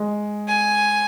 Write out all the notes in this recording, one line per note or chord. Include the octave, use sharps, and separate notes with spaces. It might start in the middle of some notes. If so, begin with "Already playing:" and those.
Already playing: G#3
G#5